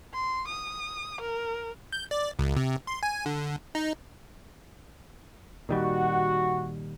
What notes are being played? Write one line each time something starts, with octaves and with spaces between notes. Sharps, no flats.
C6
D#6
A#4
G6
D5
C#2
C3
C6
G#5
D3
D#4
A#2 D#3 G3 F#4